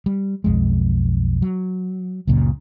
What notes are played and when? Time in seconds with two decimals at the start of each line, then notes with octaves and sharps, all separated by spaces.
0.06 G3
0.44 B1 F2 G#3
1.42 F#3
2.27 C#2 F#2 A#2 C#3